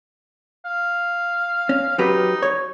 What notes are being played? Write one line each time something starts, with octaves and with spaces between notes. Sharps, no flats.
F5
C#4
F#3 D#4 G4 B4
C#5